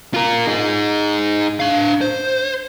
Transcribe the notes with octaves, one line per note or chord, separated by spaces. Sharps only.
F4 A#4
D#4 G#4
D4 F5
C5